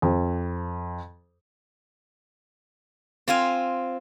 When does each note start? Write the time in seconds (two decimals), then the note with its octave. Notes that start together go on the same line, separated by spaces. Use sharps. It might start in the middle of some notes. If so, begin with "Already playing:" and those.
0.02 F2
3.28 C4 F4 F5 G#5